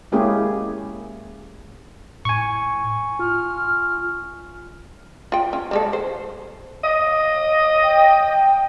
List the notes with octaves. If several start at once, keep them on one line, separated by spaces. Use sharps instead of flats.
G#3 A#3 C#4 E4 G4 G#4
A2 G#5 C#6
F4 F6
F4 G5
C#4
G3 G#3 A4
C5
D#5
G5